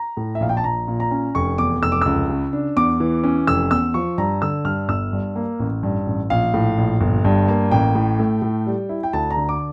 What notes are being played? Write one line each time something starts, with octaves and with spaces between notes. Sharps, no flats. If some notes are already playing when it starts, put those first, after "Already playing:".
Already playing: A#5
A2
E5
A#1 F5
G5
A5
A#1 A#5
A#2
A#5
C#4
F1 C#6
E2 D6
F1 E6
D6
C#2 E6
C#3
D4
E2 D6
E3
C#4
F1 E6
E2 E6
F3 C#6
G2 A#5
D3 E6
G2 F6
G1 E6
G2
A#3
A1
G2
A1
A#1 F5
A2
A#1
G1
G2
A#3
A1 G5
A2
A3
A2
G3
E4
G5
D2 A5
A#5
D3
D6